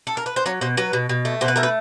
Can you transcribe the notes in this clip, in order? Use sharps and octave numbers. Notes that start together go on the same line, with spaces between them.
A4
A#4
B4
C5
F#3 C#5
B2 C5
F#3 B4
B2
B2
A3
B2 C5
B4
A3 A#4
B4